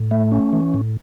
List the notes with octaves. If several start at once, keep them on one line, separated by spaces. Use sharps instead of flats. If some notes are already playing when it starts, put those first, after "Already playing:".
Already playing: A2
A3
C#4
E3
A2